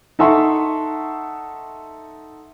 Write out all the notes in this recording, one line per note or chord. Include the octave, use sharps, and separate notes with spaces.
D#4 A4 E5 F#5 C6 C#6